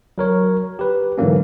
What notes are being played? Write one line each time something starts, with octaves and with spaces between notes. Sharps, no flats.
F#3 A#4 C#5
G4 B4
G#2 D3 E3 F#3 A#3 C#4